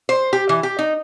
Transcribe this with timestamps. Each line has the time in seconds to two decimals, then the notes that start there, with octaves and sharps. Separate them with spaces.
0.09 C5
0.33 G4
0.49 E3
0.63 G4
0.79 D#4